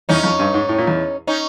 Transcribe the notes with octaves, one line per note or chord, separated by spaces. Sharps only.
E2 C#4 D#4
F2
G2
G#2
A2
A#2
E2
C#4 D#4